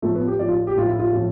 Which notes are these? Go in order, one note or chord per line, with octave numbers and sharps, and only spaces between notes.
A2 F3 A3
B3
G4
A2 F3 D5
F4
G4
A2 F3 F4
E4
F4
A2 F3